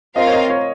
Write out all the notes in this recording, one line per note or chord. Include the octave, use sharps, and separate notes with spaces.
C4 F4 A#4 D#5 F5
C#5
D#5
C#5